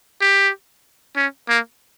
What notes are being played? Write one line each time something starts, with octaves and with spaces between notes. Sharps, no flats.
G4
C#4
A#3